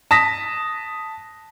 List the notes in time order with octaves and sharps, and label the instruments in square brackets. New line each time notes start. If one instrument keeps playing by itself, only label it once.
[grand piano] A5 D#6 A#6 B6